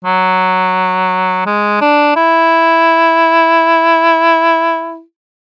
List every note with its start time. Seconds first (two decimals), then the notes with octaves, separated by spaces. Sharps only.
0.05 F#3
1.46 G#3
1.82 D4
2.16 E4